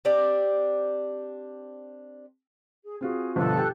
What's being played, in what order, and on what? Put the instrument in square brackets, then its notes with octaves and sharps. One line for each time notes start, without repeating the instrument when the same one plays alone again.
[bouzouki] C4 D4 G4 D5
[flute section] G#4
[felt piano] C4 F4 F#4 [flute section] G#4
[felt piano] G1 B2 F3 [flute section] A4 F#5 F#6
[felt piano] G4 G5